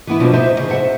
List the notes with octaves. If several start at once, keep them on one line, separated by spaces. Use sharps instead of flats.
E3 B3 E4
B2 F3 F#3 B3 D4 F4
D#4 C5 E5
D2 C#3
C5 E5 F#5